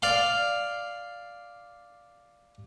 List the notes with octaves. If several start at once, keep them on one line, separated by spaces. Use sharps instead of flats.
D5 F5 C6